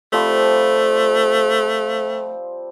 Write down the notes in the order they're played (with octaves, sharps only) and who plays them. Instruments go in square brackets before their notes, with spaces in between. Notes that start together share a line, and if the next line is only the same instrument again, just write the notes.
[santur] F3 G3 C4 [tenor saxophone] A3